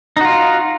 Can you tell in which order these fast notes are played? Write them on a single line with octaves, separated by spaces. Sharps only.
D#4 F#4 F4